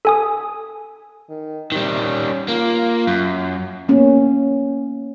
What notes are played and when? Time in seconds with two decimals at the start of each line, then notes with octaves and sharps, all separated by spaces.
0.05 A4 G#5 D#6
1.30 D#3
1.72 C3 D#3 G3
2.05 C#4
2.48 A#3 F4
3.07 F#2
3.89 A#3 B3 C#4